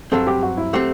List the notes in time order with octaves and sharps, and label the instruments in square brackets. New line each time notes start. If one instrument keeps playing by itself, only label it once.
[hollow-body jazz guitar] G2 F#3 C4 [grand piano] A4
[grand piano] G4
F#4
E4
[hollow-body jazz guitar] F#3 A3 C4 [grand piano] G4